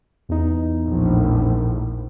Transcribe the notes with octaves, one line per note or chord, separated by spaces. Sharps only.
E2 D#4
A#1 A2